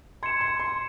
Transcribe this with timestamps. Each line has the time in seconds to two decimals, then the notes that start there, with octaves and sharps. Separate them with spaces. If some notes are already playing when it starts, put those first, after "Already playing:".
0.23 C6 G#6 C#7 E7
0.41 C6
0.60 C6